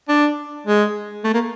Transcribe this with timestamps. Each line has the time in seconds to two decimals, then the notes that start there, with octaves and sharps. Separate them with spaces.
0.08 D4
0.67 G#3
1.24 A3
1.34 A#3